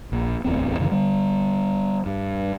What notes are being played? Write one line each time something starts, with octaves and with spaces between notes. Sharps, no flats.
A#1
D1 A1 E2 C4
F#2 C#3 E3
D3 G3
G2